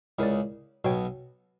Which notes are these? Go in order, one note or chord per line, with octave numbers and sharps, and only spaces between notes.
C#2 C#3 E4 A#4 D5
B1 B2 F#4 C#5 G5